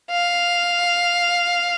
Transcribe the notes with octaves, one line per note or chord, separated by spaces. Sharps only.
F5